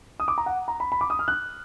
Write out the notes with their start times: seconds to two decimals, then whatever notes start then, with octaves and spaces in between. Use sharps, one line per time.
0.20 D#6
0.28 D6
0.38 A#5
0.46 F#5
0.68 A#5
0.80 B5
0.92 B5
1.01 D6
1.10 D#6
1.19 F6
1.28 F#6